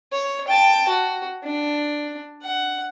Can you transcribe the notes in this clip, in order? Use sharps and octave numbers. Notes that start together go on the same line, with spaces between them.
C#5
G5 A5
F#4
D4
F#5